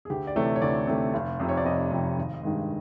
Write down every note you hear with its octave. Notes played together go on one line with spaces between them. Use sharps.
G#4
D2 G4
D5
C3 E3 A3 C#5
C#5
D2 D5
C3 E3 A3
F1
F2 C3
C#5
D5
F1 D#5
F2 C3
G#1
G2 D#3 G#3